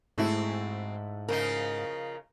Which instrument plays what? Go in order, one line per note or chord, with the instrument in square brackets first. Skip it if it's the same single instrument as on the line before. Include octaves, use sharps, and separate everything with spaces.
[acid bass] G#2 [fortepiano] G#3 A3 E4 [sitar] C4 F#4
[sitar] C#3 F3 D#4 [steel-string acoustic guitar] A#4